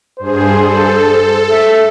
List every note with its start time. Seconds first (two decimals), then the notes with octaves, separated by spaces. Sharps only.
0.20 G2 G#4 C5
0.59 A4
1.51 E5